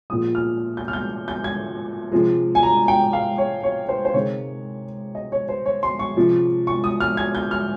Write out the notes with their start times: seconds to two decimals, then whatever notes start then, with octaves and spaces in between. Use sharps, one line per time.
0.10 A#2 F3 G#3 D#6
0.35 F6
0.77 G6
0.88 F6
0.93 G6
1.28 G6
1.44 G#6
2.12 C3 F3 G#3
2.55 G#5
2.63 A#5
2.88 G5
3.13 F5
3.38 C#5
3.64 C#5
3.89 C5
4.05 C5
4.14 C3 D#3 G#3 C#5
5.15 D#5
5.32 C#5
5.49 C5
5.66 C#5
5.83 C6
5.99 C#6
6.16 C3 F3 G#3
6.67 C#6
6.84 D#6
7.00 F6
7.17 G#6
7.35 G6
7.51 F6